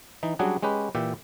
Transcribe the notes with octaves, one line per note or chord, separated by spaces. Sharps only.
E3 D#4
F#3 G3 C#4 D4 F#4 G#4
G#3 C#4 G4 B4
A#2 E3 G4 E5